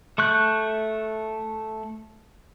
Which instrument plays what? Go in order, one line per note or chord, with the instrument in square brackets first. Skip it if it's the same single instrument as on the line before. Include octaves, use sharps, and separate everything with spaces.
[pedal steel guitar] A3 C#6 F#6 G6